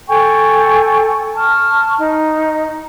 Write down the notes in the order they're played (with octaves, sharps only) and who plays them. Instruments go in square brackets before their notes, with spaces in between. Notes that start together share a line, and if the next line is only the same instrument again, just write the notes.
[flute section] A4 G5 G#5 C#6
A5 C#6 F6
D#4